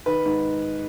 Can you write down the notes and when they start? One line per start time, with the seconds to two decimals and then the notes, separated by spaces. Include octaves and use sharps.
0.06 D#3 B4
0.26 G#2